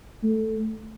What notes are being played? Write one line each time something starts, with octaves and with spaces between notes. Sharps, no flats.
A3